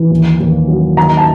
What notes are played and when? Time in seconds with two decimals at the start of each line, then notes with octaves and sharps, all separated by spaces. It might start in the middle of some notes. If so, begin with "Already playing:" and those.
Already playing: E3
0.11 D#2
0.40 D#2
0.68 F#3
0.97 D#3 A#5
1.17 A5